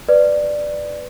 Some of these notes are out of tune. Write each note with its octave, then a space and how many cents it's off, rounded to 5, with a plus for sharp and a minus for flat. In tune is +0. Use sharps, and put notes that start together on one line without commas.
B4 +10 D5 +10